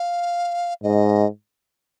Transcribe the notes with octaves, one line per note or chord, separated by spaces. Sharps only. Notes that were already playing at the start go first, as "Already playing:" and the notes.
Already playing: F5
G#2 D#5